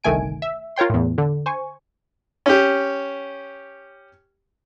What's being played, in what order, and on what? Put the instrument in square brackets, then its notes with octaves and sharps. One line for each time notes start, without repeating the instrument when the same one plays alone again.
[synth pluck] G1 C2 D#3 A3 G#5 D7
E5
F4 A#4 C#5 G5 C6
E2 A2
D3
C5 G#5 C#6
[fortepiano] C#4 G4